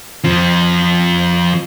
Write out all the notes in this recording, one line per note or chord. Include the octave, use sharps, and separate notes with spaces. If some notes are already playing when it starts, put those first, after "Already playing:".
F2 F3